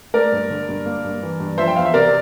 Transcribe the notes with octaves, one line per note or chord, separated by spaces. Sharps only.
A3 A#4 D5
G2
D3
G2
A#3
G2
E3
G2
F3 C5 E5
G5
E2 F5
E5
C3 A#4 D5